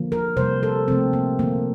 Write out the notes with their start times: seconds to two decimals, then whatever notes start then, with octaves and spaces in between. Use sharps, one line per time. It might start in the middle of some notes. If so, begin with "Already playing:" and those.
Already playing: D3 F3 A#3
0.12 A#4
0.37 C3 G3 A#3 C5
0.63 A4
0.88 C3 F3 A3 C4
1.13 A#3
1.39 D3 F3 A3 A#3